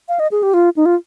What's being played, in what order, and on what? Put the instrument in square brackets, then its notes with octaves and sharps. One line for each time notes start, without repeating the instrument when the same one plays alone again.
[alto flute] F5
D#5
G#4
G4
F4
D#4
F4